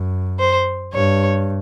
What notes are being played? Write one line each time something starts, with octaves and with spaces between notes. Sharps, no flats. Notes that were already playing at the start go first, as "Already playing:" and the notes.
Already playing: F#2
C5
G2 C#5